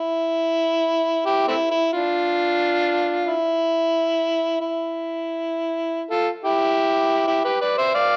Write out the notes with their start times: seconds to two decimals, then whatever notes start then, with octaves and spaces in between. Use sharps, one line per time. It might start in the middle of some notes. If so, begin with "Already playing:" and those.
Already playing: E4
1.26 E4 G4
1.48 A3 C4 E4
1.71 E4
1.93 D4 F4
3.27 E4
4.61 E4
6.10 F4 A4
6.44 E4 G4
7.27 E4 G4
7.44 G4 B4
7.61 B4 D5
7.78 C5 E5
7.95 D5 F5